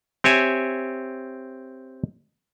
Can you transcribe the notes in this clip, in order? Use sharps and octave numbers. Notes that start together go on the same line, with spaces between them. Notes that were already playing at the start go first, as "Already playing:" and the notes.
C4 G4 C#5 E5 G#5